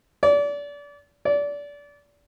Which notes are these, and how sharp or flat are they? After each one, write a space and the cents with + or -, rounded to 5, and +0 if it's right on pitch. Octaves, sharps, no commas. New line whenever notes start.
D5 -30
D5 -25